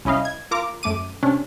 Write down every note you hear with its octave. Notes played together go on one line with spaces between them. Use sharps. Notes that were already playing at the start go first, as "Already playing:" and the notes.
C2 C#4 E4 D#5 F5
G#6
F4 A#4 A#5 D6
F#2 A3 D6 D#7
C3 C#4 D4